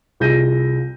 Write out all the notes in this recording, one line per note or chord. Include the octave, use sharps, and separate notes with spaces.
C2 F4 G#4 G6 A#6 D#7